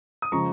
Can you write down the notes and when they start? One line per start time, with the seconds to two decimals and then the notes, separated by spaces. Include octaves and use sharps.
0.22 D#6
0.32 C#3 F3 G#3 A#5 C#6